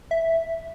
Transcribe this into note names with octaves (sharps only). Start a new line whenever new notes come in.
E5